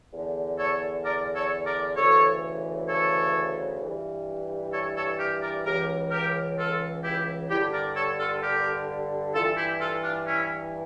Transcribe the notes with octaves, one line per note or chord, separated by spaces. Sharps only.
E2 D3
A4 C#5
A#4 D5
A4 C#5
A#4 D5
D2 C#3 E3 A4 C#5
A4 C#5
G2 E3
A4 C#5
A4 C#5
G4 A#4
A#4 D5
C#2 C#3 E3 G4 A#4
G4 A#4
F4 A4
E4 G4
G2 D3 E4 G4
A#4 D5
A4 C#5
F4 A4
G4 A#4
G2 E3 F4 A4
E4 G4
F4 A4
D4 F4
C#4 E4